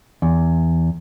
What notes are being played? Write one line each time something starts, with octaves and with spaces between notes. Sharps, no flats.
E2